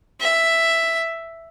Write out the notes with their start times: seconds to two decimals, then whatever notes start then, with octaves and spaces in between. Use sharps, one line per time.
0.21 E5